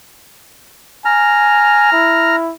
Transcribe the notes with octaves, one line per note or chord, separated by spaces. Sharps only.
G#5 A#5 F6
E4